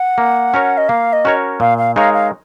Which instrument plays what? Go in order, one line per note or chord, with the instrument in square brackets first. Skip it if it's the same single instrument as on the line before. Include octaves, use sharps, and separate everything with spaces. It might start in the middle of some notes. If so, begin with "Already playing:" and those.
Already playing: [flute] F#5
[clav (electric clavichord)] A#3
C#4 F#4 A#4 C#5
[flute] D#5
[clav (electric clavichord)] A#3 [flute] F5
[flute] D#5
[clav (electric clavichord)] C#4 F#4 A#4 C#5
[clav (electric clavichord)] A#2 [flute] F5
[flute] F5
[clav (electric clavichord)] G#3 D#4 A#4 C#5 [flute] F5
[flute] F5